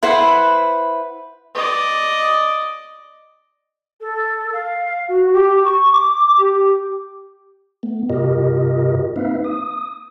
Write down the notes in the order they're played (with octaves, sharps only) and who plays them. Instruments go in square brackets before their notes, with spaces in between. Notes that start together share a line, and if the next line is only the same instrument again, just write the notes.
[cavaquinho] E4 B4 C5 F#5
[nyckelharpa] D5 D#5
[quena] A4
F5
F#4
G4
C#6
D6
G4
[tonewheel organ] A3 B3
G2 C3 F4 G4 A#4 D#5
A#3 C4 D#4 B4 E5 F5
D#6